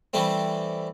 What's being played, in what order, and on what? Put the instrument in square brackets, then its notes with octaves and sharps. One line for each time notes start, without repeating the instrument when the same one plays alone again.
[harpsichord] E3 G3 A3 C4